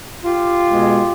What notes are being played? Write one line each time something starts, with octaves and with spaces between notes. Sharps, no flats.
F4 G4
B2 G#3